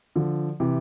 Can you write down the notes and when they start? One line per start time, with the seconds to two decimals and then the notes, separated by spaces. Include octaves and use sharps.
0.16 D3 F3
0.60 C3 E3